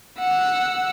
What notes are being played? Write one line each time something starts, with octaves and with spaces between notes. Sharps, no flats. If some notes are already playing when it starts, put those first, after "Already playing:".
F#5 E6